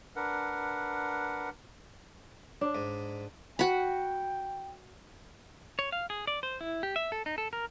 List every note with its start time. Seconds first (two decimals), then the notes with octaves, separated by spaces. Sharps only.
0.16 D4 A#4 B4 F#5
2.61 D4
2.75 G#2
3.59 F#4 G5 B5
5.79 C#5
5.92 F5
6.10 G#4
6.27 D5
6.43 C5
6.61 E4
6.83 G4
6.96 E5
7.12 A4
7.26 D#4
7.38 A4
7.53 A#4